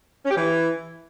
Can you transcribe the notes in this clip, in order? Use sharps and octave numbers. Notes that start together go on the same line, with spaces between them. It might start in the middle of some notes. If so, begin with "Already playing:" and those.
C#4
G4
E3